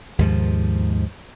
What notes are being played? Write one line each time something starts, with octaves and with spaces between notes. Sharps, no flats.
D#2 G#2 F3